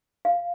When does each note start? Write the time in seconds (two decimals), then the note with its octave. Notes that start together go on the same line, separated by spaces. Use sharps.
0.25 F5